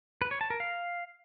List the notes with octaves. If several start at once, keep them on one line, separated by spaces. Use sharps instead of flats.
B4
C#5
A5
A#4
F5